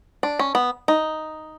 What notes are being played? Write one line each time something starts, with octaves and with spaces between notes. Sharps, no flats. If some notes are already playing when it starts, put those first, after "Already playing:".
D4
C#4
B3
D#4